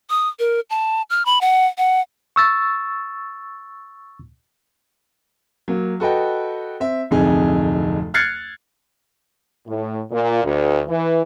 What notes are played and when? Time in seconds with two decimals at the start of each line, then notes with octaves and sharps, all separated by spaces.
0.10 D#6
0.39 A#4
0.70 A5
1.10 F6
1.26 B5
1.41 F#5
1.78 F#5
2.36 C#6 E6 A6
5.68 F#3 A#3
6.00 F#4 A4 B4 D#5 G5
6.80 C4 E5
7.11 D1 F2 C3 D#4 G#4
8.14 F6 F#6 G#6 A6 C7 C#7
9.67 A2
10.11 A#2
10.44 D2
10.88 E3